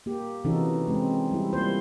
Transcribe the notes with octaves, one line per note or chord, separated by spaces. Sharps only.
A#3 G4
C3 E3 C#4 D#4 F#4 A4
G#3 C4 C#4
G3 E4
G3 A#3 F4 C5